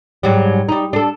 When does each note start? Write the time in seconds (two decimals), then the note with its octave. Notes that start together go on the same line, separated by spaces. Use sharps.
0.23 G#2 F#3 G3
0.69 G3 D#4
0.93 D4 A4